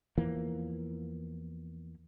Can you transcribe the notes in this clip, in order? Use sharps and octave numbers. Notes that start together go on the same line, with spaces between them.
E2 E3 F3 A#3